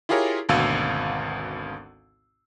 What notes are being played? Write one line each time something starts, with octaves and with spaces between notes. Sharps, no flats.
E4 F4 G4 G#4 A#4 C#5
G#1 D2 B2 F5 E6